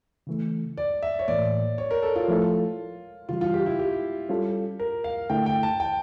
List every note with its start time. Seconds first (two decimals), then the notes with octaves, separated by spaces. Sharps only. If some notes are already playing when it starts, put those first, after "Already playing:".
0.27 C#3 E3 A3
0.78 D5
1.03 E5
1.19 C#5
1.28 A2 E3 A#3 D5
1.78 C#5
1.91 A#4
2.03 A4
2.16 F4
2.28 F3 A3 E4 A4
3.29 C#3 E3 G3 F4
3.41 F4
3.54 G4
3.66 E4
3.79 G4
4.29 G3 C#4 F4 A4
4.80 A#4
5.04 F5
5.30 D3 A3 E4 G5
5.46 G5
5.63 A5
5.80 G5